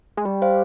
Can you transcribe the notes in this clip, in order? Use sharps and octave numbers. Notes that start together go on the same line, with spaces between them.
G#3
G3 G4
C5 F5